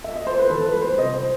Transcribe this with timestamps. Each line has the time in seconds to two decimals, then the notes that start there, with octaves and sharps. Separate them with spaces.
0.04 E5
0.16 D#5
0.27 C5
0.39 B4
0.50 E3 A4
0.66 B4
0.74 G3
0.82 C5
0.98 C3 D#5
1.14 C5